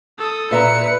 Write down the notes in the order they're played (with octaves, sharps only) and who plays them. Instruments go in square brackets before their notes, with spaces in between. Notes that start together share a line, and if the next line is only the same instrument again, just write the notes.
[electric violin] A4 D#6
[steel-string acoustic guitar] A#2 E5 A#5 [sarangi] B4 [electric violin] C#7